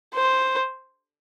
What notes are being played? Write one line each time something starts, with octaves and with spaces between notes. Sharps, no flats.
C5